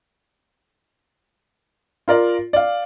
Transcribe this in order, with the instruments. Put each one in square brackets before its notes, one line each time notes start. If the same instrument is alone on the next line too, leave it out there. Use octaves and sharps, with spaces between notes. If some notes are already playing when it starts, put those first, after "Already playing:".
[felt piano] F4 A#4 D5
D5 F5